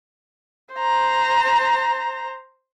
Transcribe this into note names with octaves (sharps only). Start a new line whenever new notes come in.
C5 A#5